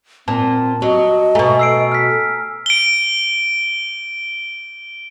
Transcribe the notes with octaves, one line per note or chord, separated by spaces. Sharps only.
A#2 C4 A5
F#3 D#5
B2 A3 G#5 A#5
E6 C7 D7
F6 B6
D7 G7